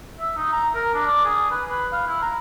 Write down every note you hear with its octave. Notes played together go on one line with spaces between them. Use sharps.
E5
D#4
A#5
A#4
D4
D5
G#4
B4
B4
F5
E4
A#5